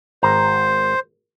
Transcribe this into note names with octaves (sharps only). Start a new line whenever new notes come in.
G#1 C5 A#5